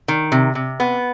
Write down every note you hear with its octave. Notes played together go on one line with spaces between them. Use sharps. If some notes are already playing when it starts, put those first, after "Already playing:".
D#3
C3
C3
B3